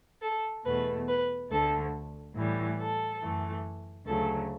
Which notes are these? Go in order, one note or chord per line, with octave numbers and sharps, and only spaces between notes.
A4
E2 B2 A3 B4
B4
D2 D3 A3 A4
A2 E3 G3
A4
F#2 E3 A3
D2 C#3 F#3 A3 A4